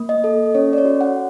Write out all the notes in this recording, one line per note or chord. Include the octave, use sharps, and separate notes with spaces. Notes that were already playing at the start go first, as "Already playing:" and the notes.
Already playing: A#3
D#5
A4
C#4 C#5
D5
C#5
F#4
F#5